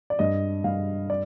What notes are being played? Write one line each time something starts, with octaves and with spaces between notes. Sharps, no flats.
D5
G2 D#5
G2 F5
D5